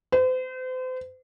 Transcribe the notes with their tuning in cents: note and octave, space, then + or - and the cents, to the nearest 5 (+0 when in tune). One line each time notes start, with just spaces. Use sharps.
C5 -40